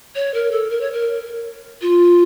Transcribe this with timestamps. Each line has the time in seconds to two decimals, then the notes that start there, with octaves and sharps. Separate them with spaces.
0.15 C#5
0.34 A#4
0.51 A4
0.70 A#4
0.81 C#5
0.92 A#4
1.81 F4